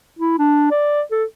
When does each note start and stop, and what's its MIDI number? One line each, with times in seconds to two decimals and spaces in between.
0.19 0.37 64
0.39 0.67 62
0.71 1.02 74
1.11 1.25 69